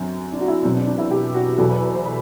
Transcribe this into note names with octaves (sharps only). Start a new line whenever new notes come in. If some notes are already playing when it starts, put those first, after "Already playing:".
Already playing: F#2 D3 F#3 C4
D4
F#4
E4
E2 B2 F#3 C4
D4
D4
E4
G4
F#4
E2 B2 F#3 A4
B4
B4
C5
B5